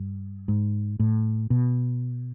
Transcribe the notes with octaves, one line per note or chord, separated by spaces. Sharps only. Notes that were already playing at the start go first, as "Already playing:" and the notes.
Already playing: G2
G#2
A2
B2